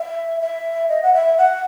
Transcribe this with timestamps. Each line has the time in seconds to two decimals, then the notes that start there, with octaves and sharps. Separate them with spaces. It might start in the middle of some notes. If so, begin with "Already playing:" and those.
Already playing: E5
0.41 E5
0.89 D#5
1.02 F#5
1.14 E5
1.38 F#5